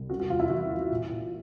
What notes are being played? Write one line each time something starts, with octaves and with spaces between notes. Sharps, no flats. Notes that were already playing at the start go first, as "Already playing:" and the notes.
Already playing: C2
C#3 F#4
F#4
E2 F4
E4
E3 F#4
E2
A#2
A#2